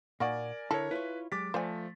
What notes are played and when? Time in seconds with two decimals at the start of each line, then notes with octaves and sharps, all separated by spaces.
0.20 A#2 A#3 D#4 F#4 A#4 D5 G#5
0.71 D3 E4 A4 A#4 C#5
0.91 E4 F4 B4 C#5
1.32 F#3 G#3 G4 D6 A6 B6
1.54 F3 A3 A4 C5 D5 G#5